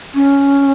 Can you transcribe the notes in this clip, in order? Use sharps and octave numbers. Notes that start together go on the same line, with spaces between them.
C#4